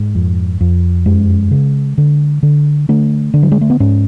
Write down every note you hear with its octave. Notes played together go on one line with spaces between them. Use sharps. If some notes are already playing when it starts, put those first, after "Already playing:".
Already playing: G#2
F2
F2
F#2 G#3
C#3
D3
D3
D3 A3
D3
F#3
G#3
A3
B3
G#2 C#4